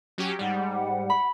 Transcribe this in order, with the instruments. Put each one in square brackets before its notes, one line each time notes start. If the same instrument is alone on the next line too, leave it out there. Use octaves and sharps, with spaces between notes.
[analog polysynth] F#3 C#4 G4
[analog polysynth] G#2 G3 [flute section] F#5
[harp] B5